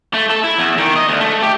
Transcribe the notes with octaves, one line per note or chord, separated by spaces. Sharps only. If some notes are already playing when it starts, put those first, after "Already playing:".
A3
A4
E4
E2
D#3
D#5
D2
A3
G4